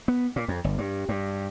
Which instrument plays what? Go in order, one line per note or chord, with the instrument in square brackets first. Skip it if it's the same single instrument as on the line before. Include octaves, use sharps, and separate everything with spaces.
[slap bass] B3
A#2
F2
G1
G2
G2